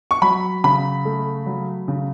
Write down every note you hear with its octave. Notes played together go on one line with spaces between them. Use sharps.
C#6
F#3 B5
C#3 B5
A3
F#3
C#3